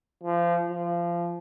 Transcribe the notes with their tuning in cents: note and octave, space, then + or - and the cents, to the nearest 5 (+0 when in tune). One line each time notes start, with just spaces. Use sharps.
F3 -25
F3 -20